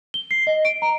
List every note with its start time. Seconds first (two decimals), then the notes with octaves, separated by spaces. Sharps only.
0.14 G7
0.31 C7
0.47 D#5
0.65 D7
0.82 A#5